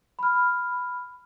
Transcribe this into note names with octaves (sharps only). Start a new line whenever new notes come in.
B5 F6